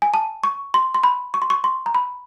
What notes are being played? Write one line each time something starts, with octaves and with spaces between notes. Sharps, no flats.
G#5
A5
C#6
C6
C6
B5
C#6
C6
C#6
C6
A#5
B5